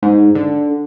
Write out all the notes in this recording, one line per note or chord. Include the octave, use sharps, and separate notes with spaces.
G#2
D3